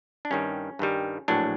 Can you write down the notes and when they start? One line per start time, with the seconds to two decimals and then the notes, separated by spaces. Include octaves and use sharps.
0.25 D4
0.31 G2 D#3 G3 C#4
0.79 G2 D#3 G3
1.28 A#1 A2 F#3 D4